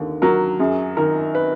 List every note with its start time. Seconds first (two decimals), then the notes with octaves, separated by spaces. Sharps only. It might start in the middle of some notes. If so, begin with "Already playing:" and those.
Already playing: D#2 D3
0.22 F#3 A#4
0.59 F#2 G#4
0.97 D#3 A#4
1.35 B4